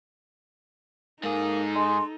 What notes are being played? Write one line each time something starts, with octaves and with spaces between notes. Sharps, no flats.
G#2 A#3 D#4 G#4 A4
G#3 C6